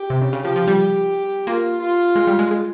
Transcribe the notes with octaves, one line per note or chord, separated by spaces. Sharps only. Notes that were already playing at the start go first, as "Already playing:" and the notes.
Already playing: G4
C3
C#3
C#3
F3 G4
F3
G3
G4
A#3 F4
F4
G#3
G3
G#3
G#3